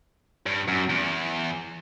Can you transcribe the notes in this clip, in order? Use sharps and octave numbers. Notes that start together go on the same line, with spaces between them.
G2
F#2
E2